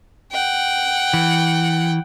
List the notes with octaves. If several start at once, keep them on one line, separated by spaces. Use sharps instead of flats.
F#5 G5
E3